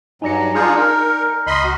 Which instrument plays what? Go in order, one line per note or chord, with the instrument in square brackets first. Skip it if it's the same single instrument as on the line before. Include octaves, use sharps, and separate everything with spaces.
[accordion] G2 F#3 [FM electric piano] D#4 D5 C#7 [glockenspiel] G#5 A#5 A#6
[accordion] D4 F4 G#4 [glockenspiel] A#5 F6 G6
[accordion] A#4 [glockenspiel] F6
[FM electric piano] C#2 [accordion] D#5 B5 C6
[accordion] F#4